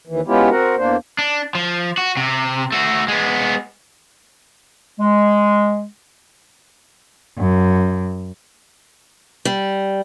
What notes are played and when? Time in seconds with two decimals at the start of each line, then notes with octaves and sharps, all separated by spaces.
0.07 D#2 E3
0.27 G#3 B3 C#4 E4 F4 G4
0.49 C4 F#4 A#4
0.77 E2 A#3 D4 C5
1.18 D4
1.55 F3
1.98 F#4
2.17 C3
2.72 A3 F#4
3.08 G#3 B3
5.00 G#3
7.37 F#2
9.45 G3